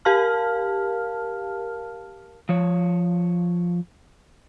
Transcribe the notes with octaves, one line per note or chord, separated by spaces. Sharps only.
G4 A#4 F5 A5 F6
F3 C#5